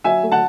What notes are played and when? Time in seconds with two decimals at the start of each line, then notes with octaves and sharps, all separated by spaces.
0.04 F#3 E5 G#5
0.23 A3
0.32 F#5 A5